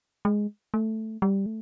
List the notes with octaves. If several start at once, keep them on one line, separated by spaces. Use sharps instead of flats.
G#3
A3
G3
A3